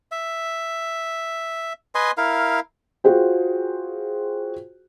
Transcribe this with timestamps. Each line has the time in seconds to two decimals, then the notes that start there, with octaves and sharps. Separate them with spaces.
0.12 E5
1.95 B4 D#5 G#5 C6
2.18 E4 A#4 F5
3.04 F4 F#4 G#4 C5 G5